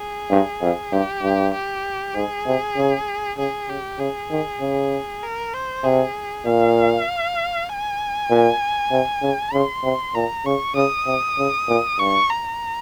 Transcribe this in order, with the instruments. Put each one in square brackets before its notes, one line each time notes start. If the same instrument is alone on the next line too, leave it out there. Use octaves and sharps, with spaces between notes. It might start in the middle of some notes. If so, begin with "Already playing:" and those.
Already playing: [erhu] G#4
[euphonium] G2
F2
[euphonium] G2 [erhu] G4
[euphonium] G2
[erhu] G4
[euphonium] G#2 [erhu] G#4
[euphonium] C3
C#3
[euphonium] C#3 [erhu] G#4
[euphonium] C#3 [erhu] G4
[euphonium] C#3 [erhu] G#4
[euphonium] D#3
C#3
[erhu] A#4
C5
[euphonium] C3 [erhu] G#4
[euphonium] A#2 [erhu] F5
[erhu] G#5
[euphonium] A#2
C3
C#3
[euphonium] C#3 [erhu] C6
[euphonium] C3
[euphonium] A#2 [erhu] A#5
[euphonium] C#3 [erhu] C#6
[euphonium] C#3 [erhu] D#6
[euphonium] C3
C#3
A#2
[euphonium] G2 [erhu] C#6
[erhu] A#5